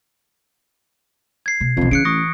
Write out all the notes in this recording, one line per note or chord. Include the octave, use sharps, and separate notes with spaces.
G#6 C7
B2
B1 F2 E3
C#3 E3 F#6 C#7 D7
A1 C#6 D#6 A#6